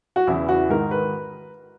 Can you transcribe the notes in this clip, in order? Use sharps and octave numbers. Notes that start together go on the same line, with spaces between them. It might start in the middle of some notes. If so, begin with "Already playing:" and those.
F#4
E2 C#3 E3 E4
F#4
G#2 D#3 A#4
B4